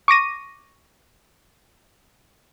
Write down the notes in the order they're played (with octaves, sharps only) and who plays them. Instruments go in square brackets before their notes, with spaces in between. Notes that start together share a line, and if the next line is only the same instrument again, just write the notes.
[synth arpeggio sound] C#6 D6 A#6 D#7